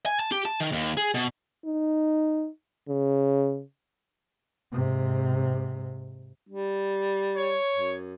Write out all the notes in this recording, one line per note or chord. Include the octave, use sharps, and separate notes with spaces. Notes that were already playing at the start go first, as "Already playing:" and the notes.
G#5
A5
G4
A5
D#3
D#2
G#4
B2
D#4
C#3
G#2 C3
G3
C#5
F#2